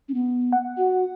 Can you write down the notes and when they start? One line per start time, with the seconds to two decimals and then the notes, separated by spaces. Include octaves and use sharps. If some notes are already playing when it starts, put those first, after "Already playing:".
0.09 C#4
0.14 B3
0.52 F#5
0.77 F#4